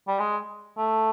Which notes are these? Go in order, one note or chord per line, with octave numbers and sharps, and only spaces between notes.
G3
G#3
A3